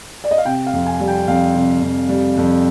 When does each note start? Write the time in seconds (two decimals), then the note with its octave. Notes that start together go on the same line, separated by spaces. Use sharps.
0.24 D5
0.31 D#5
0.38 F5
0.45 C3 G5
0.67 F5
0.73 F2
0.86 G#5
1.00 G3
1.08 G5
1.28 F2 F5
1.55 C3
1.82 F2
2.09 G3
2.37 F2